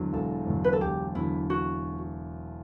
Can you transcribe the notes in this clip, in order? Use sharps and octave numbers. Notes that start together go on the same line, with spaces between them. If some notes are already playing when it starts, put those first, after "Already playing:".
Already playing: E1 E2 D3 F#3
E1 A4
E2 D3 F#3
B4
A4
E1 G4
E2 D3 F#3 E4
F#4